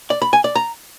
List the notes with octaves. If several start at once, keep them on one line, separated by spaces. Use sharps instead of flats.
D5
B5
G#5
D5
A#5